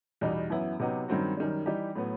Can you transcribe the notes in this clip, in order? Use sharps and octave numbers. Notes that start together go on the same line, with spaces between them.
E2 B2 G3 D#4
F#2 E3 B3 E4
C3 F#3 B3 D#4 G4
G2 D#3 F#3 C4 F#4
F#2 D#3 G3
E3 G3 D#4 G4
A2 F#3 B3